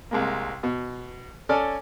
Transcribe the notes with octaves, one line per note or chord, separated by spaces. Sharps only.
C2 G#3 A#3
B2
C#4 A4 D5 G#5 F6